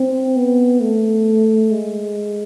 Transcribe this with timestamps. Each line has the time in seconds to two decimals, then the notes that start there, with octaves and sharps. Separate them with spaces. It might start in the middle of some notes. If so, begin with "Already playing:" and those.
Already playing: C4
0.36 B3
0.81 A3
1.71 G#3